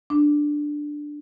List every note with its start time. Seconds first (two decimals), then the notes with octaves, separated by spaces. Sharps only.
0.10 D4